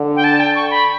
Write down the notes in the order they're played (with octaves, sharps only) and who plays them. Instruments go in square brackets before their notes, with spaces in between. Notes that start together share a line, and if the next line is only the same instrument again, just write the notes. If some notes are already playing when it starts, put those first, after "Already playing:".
Already playing: [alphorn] D3
[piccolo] G5
A5
G5
C#6
B5